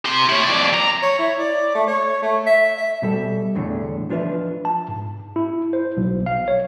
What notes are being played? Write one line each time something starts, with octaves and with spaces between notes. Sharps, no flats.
G4 C6
E4 C#5
F2 D5
A#5
C#5
E4
D5
A3
C#5
A3
E5
E5
B2 G3 A4
E2 A2 D3
F3 D4 F4 G#4 B4 E5
A5
G#2
E4
C5
B1
F5
C#5